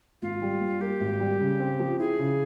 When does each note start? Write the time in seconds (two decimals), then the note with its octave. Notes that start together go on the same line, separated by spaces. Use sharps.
0.22 G#1 F4
0.42 G3
0.61 G2
0.81 A#3 G4
1.00 G#1
1.20 G3
1.40 C#3
1.60 C4
1.80 F3
1.99 E4 G#4
2.19 C#3